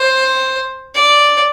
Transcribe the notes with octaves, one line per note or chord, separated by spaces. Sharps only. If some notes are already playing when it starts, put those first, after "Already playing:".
Already playing: C5
D5